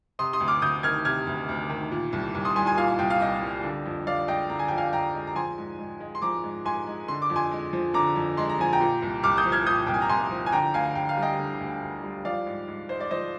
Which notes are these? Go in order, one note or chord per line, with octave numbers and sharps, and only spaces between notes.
C3 C6 D#6
C6 D#6
D2
D6 F6
D2 D#6 G6
D#3 F6 G#6
C3 F6 G#6
D2
D2
D#3
A#2
C2
C2
C6 D#6
G3 G#5 C6
G#5 C6
A#2 F5 G#5
C2 G5
F5
C2 D#5 G5
G3
D3
F2
F2 D5 F5
G#3 D#5 G5
D3 A#5
G#5
F2 G5
F5 G#5
F2 G5 A#5
G#3
A#5
F3 G#5 C6
G#2
G#2
G#3
C6
F3 A#5 D6
G#2
G#2 G#5 C6
G#3
D3 C6
D6
F2
G#5 C6
G#3
F3
D3 A#5 D6
F2
G#3 C6
A#5
F3 G#5
G5 A#5
A#2
C2
C2 D6 F6
D#6 G6
F3
F6 G#6
A#2 D#6 G6
C2 G5
G#5
A#5
C2 G#5 C6
F3
G#5
D3 G5 A#5
D2 F5 G#5
D2 G5
F5
G3
D#5 G5
D3
D2
D2
G3
F3 D5 F5
G#2
G#2
G#3 C5
D5
F3 C5 D#5